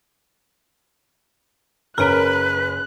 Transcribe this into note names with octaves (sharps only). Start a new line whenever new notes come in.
F#1 C#4 A#4 B4 F#6 D7